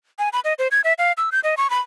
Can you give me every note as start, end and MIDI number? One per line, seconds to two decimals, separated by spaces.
0.19 0.29 80
0.33 0.40 83
0.44 0.54 75
0.59 0.68 72
0.71 0.81 92
0.84 0.93 76
0.98 1.12 77
1.17 1.30 88
1.32 1.40 91
1.44 1.55 75
1.57 1.70 85
1.70 1.81 83